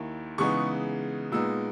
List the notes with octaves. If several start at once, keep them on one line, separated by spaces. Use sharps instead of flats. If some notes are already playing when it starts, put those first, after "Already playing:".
Already playing: D#2 D#3 A#3 E4
C#3 E3 G#3 B3 D#4 C#6
A#2 G#3 B3 D#4 E6